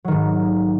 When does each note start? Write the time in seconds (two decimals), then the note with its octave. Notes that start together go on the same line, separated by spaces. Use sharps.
0.04 F#3
0.08 D#3
0.12 G#2